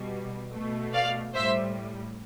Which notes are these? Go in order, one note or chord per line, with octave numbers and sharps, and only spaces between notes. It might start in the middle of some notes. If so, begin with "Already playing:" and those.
Already playing: B2 G3
B2 A3
D5 F5
A2 G3 C5 E5